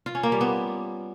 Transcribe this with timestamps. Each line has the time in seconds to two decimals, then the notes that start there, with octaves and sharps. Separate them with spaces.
0.06 F4
0.15 C#4
0.23 A#3
0.32 G3
0.41 B3